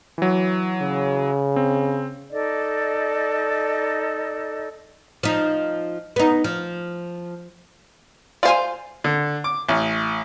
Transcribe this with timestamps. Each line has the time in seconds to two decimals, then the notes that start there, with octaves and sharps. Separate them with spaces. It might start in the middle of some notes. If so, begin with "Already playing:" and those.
0.18 E3 F#3
0.81 C#3
1.56 C4
2.31 D#4 A4 D5 D#5
5.23 F3 D#4
6.16 B3 D#4
6.44 F3
8.43 F4 C5 D5 F5 G#5
9.04 D3
9.44 D6
9.68 A1